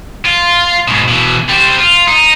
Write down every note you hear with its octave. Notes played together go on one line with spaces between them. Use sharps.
F4
G#2 B2
B2 E3
G3 C5
F4
D#4